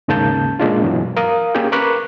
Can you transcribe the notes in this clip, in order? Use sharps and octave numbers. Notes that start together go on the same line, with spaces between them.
D#2 G#2 C#3 A#3 A5 G6
A#2 G#3 D4 F4
G2 B2 E3 F#3
A#4 F5 D#6
A#3 C#4 G4 G#4 G5
A#4 B4 B5 C#6 D6 F#6